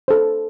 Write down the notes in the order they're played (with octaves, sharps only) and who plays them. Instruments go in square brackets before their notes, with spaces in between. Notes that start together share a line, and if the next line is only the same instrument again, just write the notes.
[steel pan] A4 C5